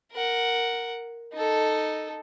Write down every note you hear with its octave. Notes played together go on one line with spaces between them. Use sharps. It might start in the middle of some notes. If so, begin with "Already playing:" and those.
A#4 F#5
D#4 A4